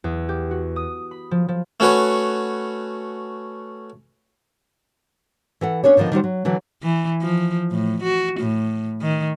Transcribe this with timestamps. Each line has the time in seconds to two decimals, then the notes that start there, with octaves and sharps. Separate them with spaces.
0.04 E2
0.29 G4
0.51 F#4
0.76 D#6
1.11 B5
1.31 F3
1.48 F3
1.80 A3 C#4 F#4 B4 C#5
5.61 E3 A4 F#5
5.84 B3 C#4 D4 A4 C#5
5.97 D3 D#3 F3 B3 D#5
6.12 D#3 G3 F#4 C5
6.24 F#3
6.45 D3 E3 F#3
6.83 E3
7.22 F3
7.71 A2
8.03 F#4
8.40 A2
9.02 D#3